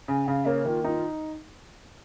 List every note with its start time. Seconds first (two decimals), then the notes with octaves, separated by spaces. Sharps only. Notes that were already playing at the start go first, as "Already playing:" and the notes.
0.08 C#3 G#5
0.27 C#3 F5
0.46 A#3 C#5
0.65 D#3 F4
0.84 D#4 F4